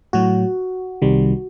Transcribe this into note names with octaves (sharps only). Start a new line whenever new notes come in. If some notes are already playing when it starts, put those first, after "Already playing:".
A2 F#3 F#4
C2 C3 D#3 G3